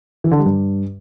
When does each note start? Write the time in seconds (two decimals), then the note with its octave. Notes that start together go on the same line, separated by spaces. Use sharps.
0.24 E3
0.31 D3
0.39 G3
0.46 G2